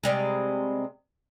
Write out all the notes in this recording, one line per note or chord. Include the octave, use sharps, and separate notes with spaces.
C3 G3 G#3